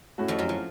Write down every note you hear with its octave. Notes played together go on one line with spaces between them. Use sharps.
A2 A3 C#4 F#4
F2 F3
F#2 F#3
F3